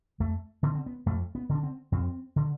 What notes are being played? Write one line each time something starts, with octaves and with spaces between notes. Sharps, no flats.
F2 A3
D3 B3
C4
B3
F2 A3
B3
D3
D4
C4
F2 C4
D3